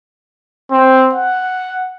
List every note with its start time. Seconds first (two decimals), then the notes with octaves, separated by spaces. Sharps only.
0.71 C4
1.13 F#5